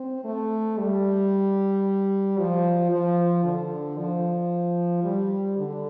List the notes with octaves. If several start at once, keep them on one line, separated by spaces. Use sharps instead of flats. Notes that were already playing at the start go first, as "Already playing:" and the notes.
Already playing: C4
A3
G3
F3
F3
D3
F3
G3
D3